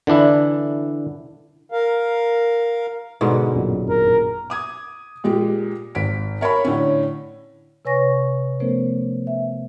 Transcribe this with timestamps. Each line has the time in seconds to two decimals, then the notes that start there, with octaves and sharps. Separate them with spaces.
0.07 D3 E3 D4 E4
1.72 A#4 F5
3.21 G#2 B2 D3
3.54 G#1 F#2 A#2
3.90 A#4
4.50 D6 D#6 G#6
5.24 A#2 G#3 G4
5.95 G#1 B6 D7
6.41 A#4 C#5 A5 B5
6.65 A2 D3 C#4
7.85 C3 B4 C#5 G#5 C#6 A#6
8.60 F3 A3 B3 C#4 A#4 C5
9.27 E5